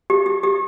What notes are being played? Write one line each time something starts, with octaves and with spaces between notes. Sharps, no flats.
G4
G4
G4